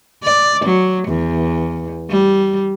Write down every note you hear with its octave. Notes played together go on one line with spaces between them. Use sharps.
D5
F#3
E2
G3